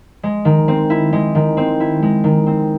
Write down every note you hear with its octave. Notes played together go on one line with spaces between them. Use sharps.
G#3
D#3
C4
E4
G#3
D#3
C4
E4
G#3
D#3
C4